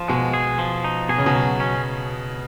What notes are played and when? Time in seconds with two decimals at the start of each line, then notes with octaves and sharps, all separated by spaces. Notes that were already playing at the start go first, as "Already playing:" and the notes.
Already playing: F3
0.08 B2 G#3
0.33 G#4
0.59 F3
0.84 D#4
1.09 B2 G#4
1.18 C#3
1.26 B2
1.35 F#3
1.60 C#4